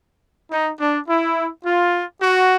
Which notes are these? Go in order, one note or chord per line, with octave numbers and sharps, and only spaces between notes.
D#4
D4
E4
F4
F#4